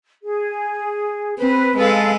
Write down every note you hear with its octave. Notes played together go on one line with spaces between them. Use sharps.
G#4
C4 B4
G#3 A4 B4 F5